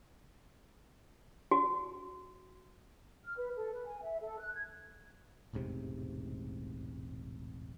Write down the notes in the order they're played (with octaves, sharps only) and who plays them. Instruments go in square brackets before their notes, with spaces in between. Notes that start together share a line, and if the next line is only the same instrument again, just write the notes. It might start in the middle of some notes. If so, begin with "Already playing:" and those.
[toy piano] F#4
[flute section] F6
B4
A4
B4
G#5
E5
A4
F#6
G#6
[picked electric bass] E1 A1 G#2 C3